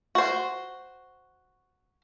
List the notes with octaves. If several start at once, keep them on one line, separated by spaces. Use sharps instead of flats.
F#4 C5